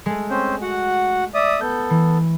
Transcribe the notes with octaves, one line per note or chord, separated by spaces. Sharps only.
G#3 A3
C4 C#4 C5
F#4 F#5
D5 E5 D#6
B3 A4 G6
E3